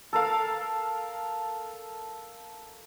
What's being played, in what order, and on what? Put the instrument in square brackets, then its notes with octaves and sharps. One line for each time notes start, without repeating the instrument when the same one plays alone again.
[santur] A4 A#4 F5